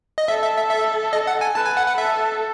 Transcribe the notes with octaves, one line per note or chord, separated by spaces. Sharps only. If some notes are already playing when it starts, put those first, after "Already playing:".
D#5
A4 E5
E5
E5
E5
D#5
F#5
G#5
B4 A5
G#5
F#5
F#5
A4 E5